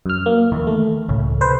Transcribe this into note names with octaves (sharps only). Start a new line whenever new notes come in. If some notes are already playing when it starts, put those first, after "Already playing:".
F#2 F6
A#3
D#2 D#3 E3
A3
C#2 A2 C#3
C3 B4 C5